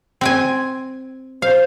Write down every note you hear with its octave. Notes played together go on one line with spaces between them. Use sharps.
C4 G5 G#5
C5 F5